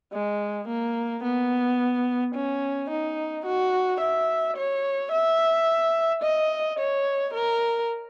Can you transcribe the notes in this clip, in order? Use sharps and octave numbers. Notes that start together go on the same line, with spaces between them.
G#3
A#3
B3
C#4
D#4
F#4
E5
C#5
E5
D#5
C#5
A#4